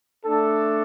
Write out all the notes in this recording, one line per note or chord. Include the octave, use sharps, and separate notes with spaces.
A3 D4 A4